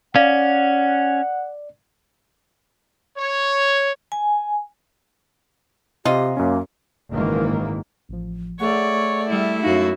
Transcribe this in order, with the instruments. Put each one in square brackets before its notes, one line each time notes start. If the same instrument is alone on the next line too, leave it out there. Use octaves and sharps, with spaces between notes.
[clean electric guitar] C#4 [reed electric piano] D5 [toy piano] F5 [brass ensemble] F#5
[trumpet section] C#5
[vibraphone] G#5
[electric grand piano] C3 [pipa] F4 D#5 [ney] G4
[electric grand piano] F#2 C#4 [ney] A#3
[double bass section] F#1 G#2 D#3 E3 A#3
[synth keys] A1 F3
[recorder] A3 [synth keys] G#4 F#5 [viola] C#5 D5
[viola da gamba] G3 [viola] E4
[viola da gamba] F#2 F#4 [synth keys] D#4 F5 A#6